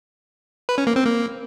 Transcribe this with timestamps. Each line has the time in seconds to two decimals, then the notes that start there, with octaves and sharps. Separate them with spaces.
0.69 B4
0.78 C#4
0.87 A#3
0.96 C4
1.05 A#3